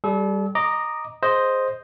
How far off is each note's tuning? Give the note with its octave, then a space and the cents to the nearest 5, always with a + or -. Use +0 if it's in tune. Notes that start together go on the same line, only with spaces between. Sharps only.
G3 +0 A4 -40
D#5 -10 A#5 +5 D6 +0
G#4 +0 C5 +0 D#5 +0